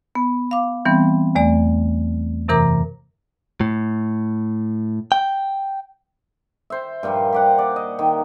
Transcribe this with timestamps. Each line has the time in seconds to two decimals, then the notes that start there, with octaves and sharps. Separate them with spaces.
0.15 B3
0.51 F5 D6
0.85 E3 G3 B3 C4
1.35 E2 A3 D5
2.48 F#2 C3 E3 A#4 A#5 D6
3.61 A2
5.12 G5
6.70 C5 E5
7.03 G2 A#2 F3 A#3
7.32 G4 D5 F#5
7.58 D5
7.76 D#5
7.99 D#3